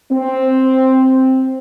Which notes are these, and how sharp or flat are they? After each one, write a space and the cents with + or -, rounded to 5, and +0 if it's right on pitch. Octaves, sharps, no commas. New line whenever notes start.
C4 +5